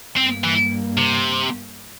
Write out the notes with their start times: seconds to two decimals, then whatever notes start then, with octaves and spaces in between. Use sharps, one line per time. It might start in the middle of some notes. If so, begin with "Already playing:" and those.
0.17 G2 G3 A#3 C4
0.44 E3
0.97 C3